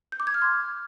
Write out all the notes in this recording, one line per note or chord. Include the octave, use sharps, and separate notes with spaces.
G6
D6
G#6
F6
C6